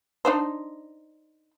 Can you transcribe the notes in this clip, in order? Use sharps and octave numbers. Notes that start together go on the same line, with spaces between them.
D4 D#4 C5